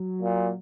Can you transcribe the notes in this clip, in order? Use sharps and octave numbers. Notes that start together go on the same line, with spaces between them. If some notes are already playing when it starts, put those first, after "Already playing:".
Already playing: F#3
A#2